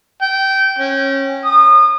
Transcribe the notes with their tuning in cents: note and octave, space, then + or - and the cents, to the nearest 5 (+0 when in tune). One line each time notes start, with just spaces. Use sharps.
G5 -20
C#4 -25
D#6 -30